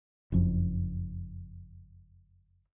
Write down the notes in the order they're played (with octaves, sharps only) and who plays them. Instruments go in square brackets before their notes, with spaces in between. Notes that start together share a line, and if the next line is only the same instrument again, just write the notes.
[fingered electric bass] F#1 F2